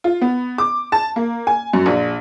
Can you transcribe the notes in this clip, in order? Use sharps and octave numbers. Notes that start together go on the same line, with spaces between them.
F4
B3
D6
A5
A#3
G#5
F#2
A#1